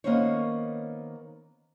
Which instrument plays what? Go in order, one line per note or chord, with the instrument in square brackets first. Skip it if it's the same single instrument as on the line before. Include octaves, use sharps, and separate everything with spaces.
[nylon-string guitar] D#3 A#3 B3 C#4 C5 C#5